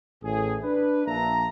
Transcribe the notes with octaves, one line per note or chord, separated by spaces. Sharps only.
A1 A2 G#4
D4 B4
A#1 A#3 E5 A5 A#5